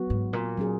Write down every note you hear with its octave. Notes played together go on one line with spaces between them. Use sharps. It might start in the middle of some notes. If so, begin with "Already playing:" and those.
Already playing: F#3 B3 F#4
G#2
A#2
F#3 C#4 G#4